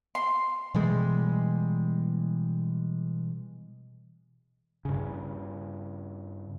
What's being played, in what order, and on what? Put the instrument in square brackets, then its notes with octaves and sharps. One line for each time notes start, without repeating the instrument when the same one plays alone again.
[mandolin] C6
[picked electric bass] B2 E3 G3 G#3
[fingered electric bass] G2 C#3